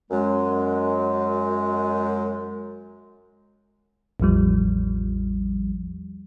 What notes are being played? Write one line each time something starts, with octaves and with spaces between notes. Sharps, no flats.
F#2 G#3
A1 E2 F3 G3